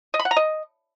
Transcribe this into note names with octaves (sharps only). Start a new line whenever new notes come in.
D#5
B5
F#5
A#5
D#5